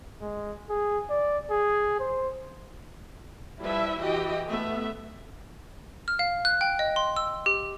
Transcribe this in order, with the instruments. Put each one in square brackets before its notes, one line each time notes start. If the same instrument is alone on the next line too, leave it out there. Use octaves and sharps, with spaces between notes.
[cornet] G#3
G#4
D5
G#4
C5
[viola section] F3 G3 E4 B4 E5
E3 F#4 G4 D#5 G5
A3 B3 E5
[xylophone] F6
F5
F#6
G5
D#5
C6
E6
G4